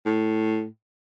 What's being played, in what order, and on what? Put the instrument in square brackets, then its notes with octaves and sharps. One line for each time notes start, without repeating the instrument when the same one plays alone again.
[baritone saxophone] A2